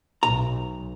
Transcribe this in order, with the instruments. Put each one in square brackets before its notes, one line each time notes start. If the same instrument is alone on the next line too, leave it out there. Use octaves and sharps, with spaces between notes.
[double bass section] B1 [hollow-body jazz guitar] A#5